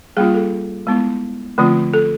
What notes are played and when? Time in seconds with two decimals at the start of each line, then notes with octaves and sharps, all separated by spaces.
0.17 G3 A#3 C#4 F4 G#4
0.34 A4
0.87 G#3 B3 E4
1.58 D3 F3 A3 C4 F4
1.94 A4